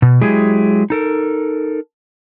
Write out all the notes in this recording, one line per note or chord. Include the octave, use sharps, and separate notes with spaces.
B2
F#3 G#3 E4 G4 G#4
D#4 A4 A#4